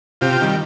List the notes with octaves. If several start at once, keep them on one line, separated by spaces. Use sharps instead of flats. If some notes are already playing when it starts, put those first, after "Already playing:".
C3 F4 G4
D#3 G3